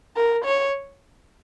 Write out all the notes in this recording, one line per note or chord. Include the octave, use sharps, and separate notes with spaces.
A#4
C#5